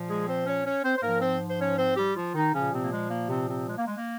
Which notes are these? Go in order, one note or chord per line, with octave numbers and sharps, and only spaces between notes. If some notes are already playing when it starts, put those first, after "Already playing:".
Already playing: A#2 F3
G#3 G#4
C4 C5
C#4 C#5
C#4 C#5
C4 C5
C5
G#2 F3 A#3 A#4
C4 C5
C5
C#4 C#5
C4 C5
G3 G4
F3 F4
D#3 D#4
A#2 C#3 F3 C#4
C3 C4
A#3
G#3
A#3
C3 C4
C3 C4
G#3
A#3
G#3
A#3